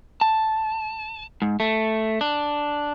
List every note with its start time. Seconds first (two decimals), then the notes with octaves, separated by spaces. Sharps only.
0.21 A5
1.42 G#2
1.60 A3
2.21 D4